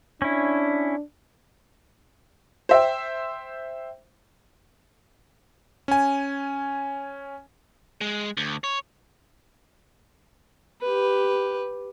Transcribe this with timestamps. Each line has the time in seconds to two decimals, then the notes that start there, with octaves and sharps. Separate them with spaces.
0.22 C#4 D4 E4
2.69 C5 E5 G5
5.88 C#4 G#5
8.01 G#3
8.37 D2
8.64 C#5
10.81 G4 B4